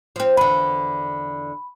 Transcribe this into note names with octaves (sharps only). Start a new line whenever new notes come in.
F3 C4
E2 D3 B5